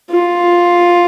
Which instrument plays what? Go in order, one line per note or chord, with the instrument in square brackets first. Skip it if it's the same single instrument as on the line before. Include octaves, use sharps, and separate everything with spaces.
[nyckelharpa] F4